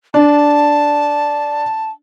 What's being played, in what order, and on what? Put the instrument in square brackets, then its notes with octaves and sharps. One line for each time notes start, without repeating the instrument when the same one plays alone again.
[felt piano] D4 [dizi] A5